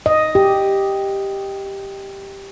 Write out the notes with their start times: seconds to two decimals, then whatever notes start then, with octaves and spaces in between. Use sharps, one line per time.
0.06 D#5
0.35 G4